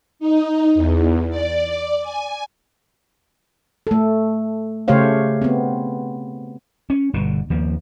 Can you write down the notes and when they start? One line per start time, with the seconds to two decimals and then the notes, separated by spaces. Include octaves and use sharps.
0.19 D#4
0.75 E2
1.29 D5
2.01 G#5
3.87 A3 A4
4.88 C#3 A3 G4 C5 C#5 F5
5.42 B3 C4
6.90 C#4
7.13 G1 B2 D3
7.50 D#2 F3 A#3